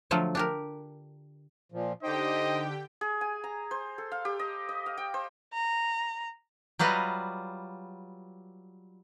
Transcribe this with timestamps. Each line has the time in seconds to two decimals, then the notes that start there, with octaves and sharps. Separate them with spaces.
0.11 D3 F3 F#3 A3 F4
0.35 D4 G4 A#4
1.72 A#2 F3
2.03 D3 D#4 G4 C5 D#5 G5
3.01 G#4
3.21 G#5
3.44 A#5
3.71 C5
3.98 A4
4.12 F5
4.25 G4
4.39 D#5
4.69 D#5
4.86 F5
4.97 G5
5.14 C5
5.54 A#5
6.79 F#3 G3 F4 B4 D#5